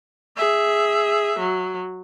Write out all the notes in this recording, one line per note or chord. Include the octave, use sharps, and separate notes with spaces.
G#4 E5
F#3